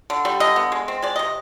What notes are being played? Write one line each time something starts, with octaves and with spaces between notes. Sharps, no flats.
D3
G3
D3 D#5
B3
G#3
C4
G#3 D5
C3 D#5